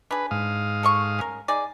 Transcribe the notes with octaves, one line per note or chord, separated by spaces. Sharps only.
D4 G#4 B4
G#2 F5 D#6
A4 D#5 C#6
C#4 A#4
D#4 G#4 D5